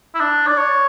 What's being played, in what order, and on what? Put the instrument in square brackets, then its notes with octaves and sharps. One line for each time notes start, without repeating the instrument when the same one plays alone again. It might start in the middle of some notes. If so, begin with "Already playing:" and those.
[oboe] E4
D4
D5
C#5